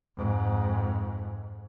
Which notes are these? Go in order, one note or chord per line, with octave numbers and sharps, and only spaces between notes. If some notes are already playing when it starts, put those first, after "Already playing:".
F2 G#2